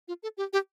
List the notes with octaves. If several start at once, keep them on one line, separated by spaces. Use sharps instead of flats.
F4
A4
G4
G4